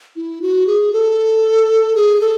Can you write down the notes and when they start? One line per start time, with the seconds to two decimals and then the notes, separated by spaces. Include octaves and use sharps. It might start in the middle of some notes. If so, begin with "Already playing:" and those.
0.16 E4
0.42 F#4
0.67 G#4
0.93 A4
1.95 G#4
2.21 A4